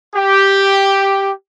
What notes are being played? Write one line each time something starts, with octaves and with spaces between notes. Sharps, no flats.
G4